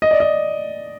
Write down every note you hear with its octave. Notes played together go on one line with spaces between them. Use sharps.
D#5
D5
D#5